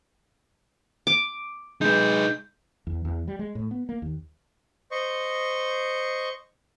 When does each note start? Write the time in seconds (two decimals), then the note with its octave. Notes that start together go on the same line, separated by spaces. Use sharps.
1.07 D6
1.81 G#3 D#4 B4 G6
2.87 E2
3.05 E2
3.28 G3
3.39 G#3
3.55 A2
3.71 B3
3.89 A#3
4.02 D#2
4.91 C5 D#5 C#6